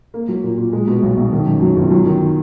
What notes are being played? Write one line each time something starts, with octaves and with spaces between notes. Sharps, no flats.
A#3
F#3
A#2
A#2
G#3
B2
B1
B1
D#3
F#2
F#3
G1
F#3
D#3